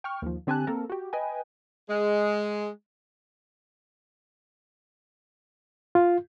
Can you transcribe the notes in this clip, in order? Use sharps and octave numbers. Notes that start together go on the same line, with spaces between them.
G5 C#6 F6
D#2 F3
D3 C4 G4 G#5 A5 F#6
A#3 C4 A4 A#4
F#4 G4
B4 D#5 G5 G#5
G#3
F4